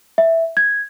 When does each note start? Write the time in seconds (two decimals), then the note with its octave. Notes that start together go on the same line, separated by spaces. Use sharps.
0.18 E5
0.57 G#6